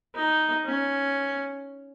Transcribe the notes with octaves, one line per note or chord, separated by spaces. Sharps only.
D#4
C#4